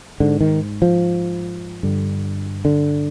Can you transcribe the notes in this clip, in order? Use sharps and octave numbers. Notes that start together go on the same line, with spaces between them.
G#2 D3
D#3
F3
G2 D3
D3